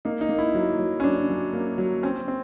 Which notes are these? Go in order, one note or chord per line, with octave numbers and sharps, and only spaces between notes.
A#3 D#4
D#4
A#3
E4
F#3
F#3
C#4
F#3 D4
F#3
A#3
F#3
C4 C#4
C4